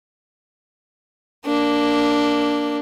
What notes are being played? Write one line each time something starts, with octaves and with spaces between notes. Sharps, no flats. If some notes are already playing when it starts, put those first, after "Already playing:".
A#3 D4